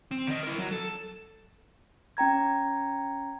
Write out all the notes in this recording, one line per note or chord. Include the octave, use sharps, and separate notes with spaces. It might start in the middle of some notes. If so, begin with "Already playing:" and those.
C4
D3 D#5
E4 A#4
F#3
A4
C#4 G5 A#5 G#6